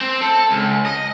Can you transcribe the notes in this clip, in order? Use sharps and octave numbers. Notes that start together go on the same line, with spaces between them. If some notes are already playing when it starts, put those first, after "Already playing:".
C4
A4
C#2
D#5